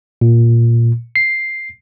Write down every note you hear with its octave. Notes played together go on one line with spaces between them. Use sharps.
A#2
C7